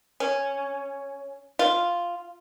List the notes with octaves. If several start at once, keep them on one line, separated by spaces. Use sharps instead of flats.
C#4
F4